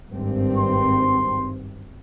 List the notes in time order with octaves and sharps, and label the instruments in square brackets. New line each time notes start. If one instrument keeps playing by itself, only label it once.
[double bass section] G#1 G2 C4
[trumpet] C6